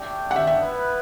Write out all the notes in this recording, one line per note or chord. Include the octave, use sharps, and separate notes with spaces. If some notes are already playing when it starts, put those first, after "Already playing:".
Already playing: A3 D4 G4 D5 G5
F#5
E5
E5
B3 E4 B4